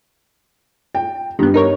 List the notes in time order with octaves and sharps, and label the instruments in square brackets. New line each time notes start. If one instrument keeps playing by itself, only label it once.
[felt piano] G5
[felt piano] G2 [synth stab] D#3 B3
[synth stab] D#4 A#4 C#5